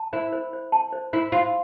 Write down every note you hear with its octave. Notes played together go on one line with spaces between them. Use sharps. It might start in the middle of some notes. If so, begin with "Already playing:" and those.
Already playing: A5
E4 C5
C5
C5
A5
C5
E4 C5
F4 C5